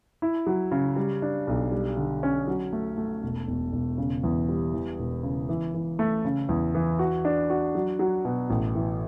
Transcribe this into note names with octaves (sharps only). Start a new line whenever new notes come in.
E4
F#3
C#3
G3
D4
B1
G3
D3
C#4
F#3
A3
A3
E1
E1
E1
C#3
E2
G3
E3
E1
C#3
E3
E3
A3
C#3
E2
E3
F#4
D4
F#4
F#3
F#3
B2
A1
E3